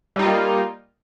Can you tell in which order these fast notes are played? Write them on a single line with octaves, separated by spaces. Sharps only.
G3 D#4 F4 A#3